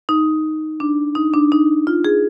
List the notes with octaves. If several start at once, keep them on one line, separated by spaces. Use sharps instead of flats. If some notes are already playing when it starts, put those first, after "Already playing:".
D#4
D4
D#4
D4
D#4
F4
G#4